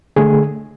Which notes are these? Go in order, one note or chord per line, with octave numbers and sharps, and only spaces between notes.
D3 A3 G#4